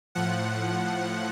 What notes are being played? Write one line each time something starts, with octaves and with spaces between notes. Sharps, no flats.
A2 F3 F#5